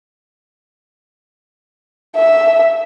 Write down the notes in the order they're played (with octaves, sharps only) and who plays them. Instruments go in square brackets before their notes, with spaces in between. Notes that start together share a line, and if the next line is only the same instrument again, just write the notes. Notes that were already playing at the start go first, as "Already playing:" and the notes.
[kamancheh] E5